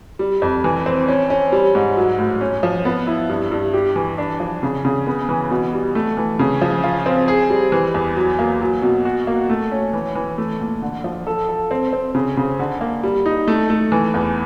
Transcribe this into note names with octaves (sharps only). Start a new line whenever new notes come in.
G3
F2
E3
C4
C#4
C#4
G3
G#2
F#3
A2
C#4
F3
B3
E4
G2
G2
G4
E3
D4
F3
C#3
C#3
B3
E3
B2
G3
A3
E3
C#3
F3
F4
C4
G#4
G3
E3
E2
F#3
A#3
F#3
B2
F#4
A#3
A3
C#4
E3
E3
A3
A#2
D3
F3
A4
A4
C4
C4
C#3
C#3
D3
A#3
G3
D#4
A3
A3
E3
E2